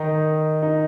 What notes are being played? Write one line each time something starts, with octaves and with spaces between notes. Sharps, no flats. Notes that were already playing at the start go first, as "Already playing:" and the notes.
Already playing: D#3 D#4
D#4